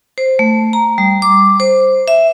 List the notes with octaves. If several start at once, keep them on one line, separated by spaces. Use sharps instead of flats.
C5
A3
A#5
G3
D6
C5
E5